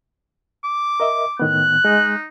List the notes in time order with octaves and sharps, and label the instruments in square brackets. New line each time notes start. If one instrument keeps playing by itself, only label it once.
[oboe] D6
[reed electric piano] A#4 D#5 E5
[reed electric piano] A2 D#3 B3 [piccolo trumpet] F#6
[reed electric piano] G#3 [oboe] D#4